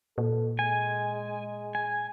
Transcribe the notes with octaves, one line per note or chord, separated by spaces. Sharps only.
A#2 A4
G#3 G#5
G#5